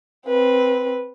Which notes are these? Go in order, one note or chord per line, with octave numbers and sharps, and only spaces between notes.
C4 B4